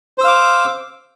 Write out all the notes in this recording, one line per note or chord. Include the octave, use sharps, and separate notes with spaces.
C5 F5 D6 E6